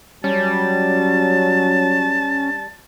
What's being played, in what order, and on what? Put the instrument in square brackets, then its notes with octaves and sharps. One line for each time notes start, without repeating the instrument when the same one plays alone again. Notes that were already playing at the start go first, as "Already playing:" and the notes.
[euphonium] F#3 [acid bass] G3 [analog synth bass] C#4 [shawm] A5